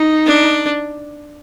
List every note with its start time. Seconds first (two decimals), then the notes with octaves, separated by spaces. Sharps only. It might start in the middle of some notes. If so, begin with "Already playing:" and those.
Already playing: D#4
0.26 D4